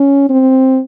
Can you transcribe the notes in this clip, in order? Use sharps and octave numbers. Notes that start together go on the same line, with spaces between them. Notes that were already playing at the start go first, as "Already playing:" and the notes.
Already playing: C#4
C4